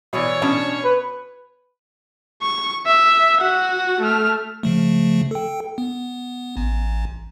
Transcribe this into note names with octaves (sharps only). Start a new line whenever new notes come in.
B2 E3 C#5 D5
B2 C#4 D4
B4
C#6
E5
F#4 F#5
A3 F6
C#3 F3 A3
A4 G5
B3
A1